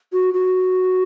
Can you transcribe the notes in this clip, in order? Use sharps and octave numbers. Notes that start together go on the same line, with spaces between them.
F#4
F#4